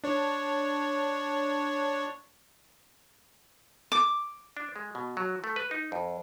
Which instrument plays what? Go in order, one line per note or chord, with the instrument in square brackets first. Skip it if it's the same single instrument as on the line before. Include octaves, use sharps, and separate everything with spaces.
[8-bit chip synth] D4 C#5
[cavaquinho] D6
[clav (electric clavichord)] D4
G#3
B2
F#3
A3
B4
D#4
F2